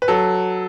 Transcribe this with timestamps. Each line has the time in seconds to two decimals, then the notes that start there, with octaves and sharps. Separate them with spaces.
0.02 B4
0.08 F#3 A4